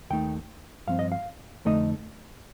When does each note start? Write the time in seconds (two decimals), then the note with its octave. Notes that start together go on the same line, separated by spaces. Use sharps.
0.10 D#2 D#3 A3 D#4 G5
0.87 G2 F3 C4 F5
0.99 D#5
1.12 F5
1.65 F2 D3 A3 D#4 D#5